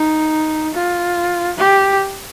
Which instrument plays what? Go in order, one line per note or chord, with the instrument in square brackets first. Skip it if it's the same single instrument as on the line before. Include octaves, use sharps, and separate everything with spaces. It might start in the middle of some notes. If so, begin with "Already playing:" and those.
Already playing: [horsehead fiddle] D#4
F4
G4